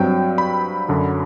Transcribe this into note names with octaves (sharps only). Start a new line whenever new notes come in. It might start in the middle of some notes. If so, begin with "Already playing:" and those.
Already playing: G2 F#3 C4 G5
B5
F#2 D3 F#3